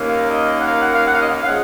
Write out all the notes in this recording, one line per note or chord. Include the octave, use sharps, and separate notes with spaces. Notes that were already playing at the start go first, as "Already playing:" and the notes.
Already playing: D#2 D#3 A#3 C#4
F5
D#5
F#5
F5
F#5
F5
F#5
F5
D#5
F5
F5
F3 G#3 C#4 F#5